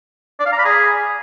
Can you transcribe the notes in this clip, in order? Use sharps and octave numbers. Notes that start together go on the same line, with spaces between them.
D5
F5
A#5
B5
G#4